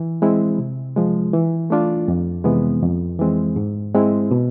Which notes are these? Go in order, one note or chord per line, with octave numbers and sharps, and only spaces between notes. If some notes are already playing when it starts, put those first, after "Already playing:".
Already playing: E3
G#3 C4 E4
C3
F3 G#3
E3
A3 D4 F4
F2
C3 E3 G#3 B3
F2
E3 G#3 C4
G#2
G#3 C4 E4
B2